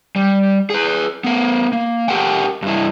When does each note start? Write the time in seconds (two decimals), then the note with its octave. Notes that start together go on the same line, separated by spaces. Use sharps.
0.16 G3
0.70 G#4 B4
1.24 B3 A#4
1.73 A#3
2.08 G4 A#4 F#5 G5
2.62 G2 E4